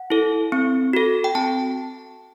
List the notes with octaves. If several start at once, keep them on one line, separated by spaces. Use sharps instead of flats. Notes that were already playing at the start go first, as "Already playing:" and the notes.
Already playing: F#5
E4 A4
C4
F#4 A4
G5
C4 A5